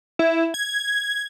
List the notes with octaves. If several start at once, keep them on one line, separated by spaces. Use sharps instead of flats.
E4
G#6